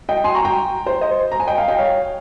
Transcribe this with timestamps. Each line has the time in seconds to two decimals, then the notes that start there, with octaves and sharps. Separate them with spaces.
0.09 D#5 G5
0.24 G#5 C6
0.35 A#5 C#6
0.45 G5 A#5
0.86 C5
1.01 C5 D#5
1.31 A#5
1.40 G#5
1.47 D#5 G5
1.58 F5 G#5
1.68 D#5 G5
1.79 C#5 F5